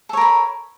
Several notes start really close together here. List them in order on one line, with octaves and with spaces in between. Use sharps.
A4 C#5 A#4 B5